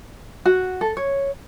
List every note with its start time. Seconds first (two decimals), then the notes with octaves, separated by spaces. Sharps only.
0.45 F#4
0.81 A4
0.97 C#5